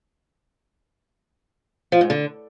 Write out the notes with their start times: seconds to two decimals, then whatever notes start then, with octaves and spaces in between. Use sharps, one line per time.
1.92 F3
2.01 G#2
2.10 D3